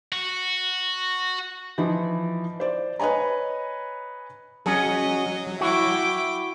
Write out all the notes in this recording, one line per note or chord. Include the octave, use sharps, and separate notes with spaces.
F#4
E3 F3 D#4
C5 D5
B4 C#5 D#5 G#5 A#5
F#3 C#4 F#4 G#4 D#5
E4 F#4 G5 D6